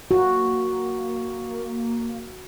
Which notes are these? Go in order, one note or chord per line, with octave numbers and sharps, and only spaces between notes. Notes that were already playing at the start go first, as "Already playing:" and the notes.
A#3 F#4